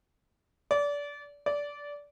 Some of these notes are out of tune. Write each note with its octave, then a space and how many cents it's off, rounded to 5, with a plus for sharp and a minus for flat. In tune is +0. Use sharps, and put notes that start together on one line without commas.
D5 -25
D5 -15